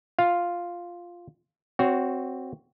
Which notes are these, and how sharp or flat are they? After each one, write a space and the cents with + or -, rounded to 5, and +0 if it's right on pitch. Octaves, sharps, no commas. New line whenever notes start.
F4 +0 F5 +0
C4 +0 F#4 +0 C#5 +25